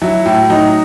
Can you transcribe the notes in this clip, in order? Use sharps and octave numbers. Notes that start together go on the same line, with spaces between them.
F#3 E4
A2
F#3 D#4